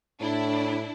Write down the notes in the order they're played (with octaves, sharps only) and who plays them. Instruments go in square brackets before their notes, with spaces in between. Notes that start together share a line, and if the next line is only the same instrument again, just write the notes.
[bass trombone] A2 [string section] D4 E4